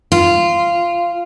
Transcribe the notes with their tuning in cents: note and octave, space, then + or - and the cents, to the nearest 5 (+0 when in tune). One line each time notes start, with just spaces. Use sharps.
F4 -15